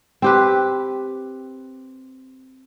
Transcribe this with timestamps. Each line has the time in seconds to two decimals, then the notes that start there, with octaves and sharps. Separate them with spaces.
0.22 C4 G4 B4